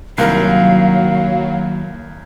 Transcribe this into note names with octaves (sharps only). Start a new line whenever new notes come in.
C2 D#3 F#3 A#3 E4 A#4 F5